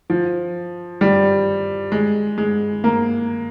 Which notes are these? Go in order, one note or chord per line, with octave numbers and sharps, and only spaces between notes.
F3
G3
G#3
G#3
A#3